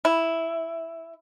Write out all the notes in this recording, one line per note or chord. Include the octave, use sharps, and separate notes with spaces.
E4